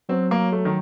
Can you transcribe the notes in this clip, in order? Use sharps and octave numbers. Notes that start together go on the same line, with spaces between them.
F#3 C4
A#3
A3
D#3